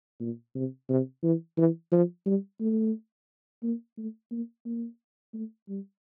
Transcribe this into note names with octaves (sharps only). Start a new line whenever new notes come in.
A#2
C3
C3
E3
E3
F3
G3
A3
A#3
A3
A#3
A#3
A3
G3